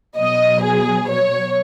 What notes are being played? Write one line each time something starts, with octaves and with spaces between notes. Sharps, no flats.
B2 F#3 D#5
G#4
C#5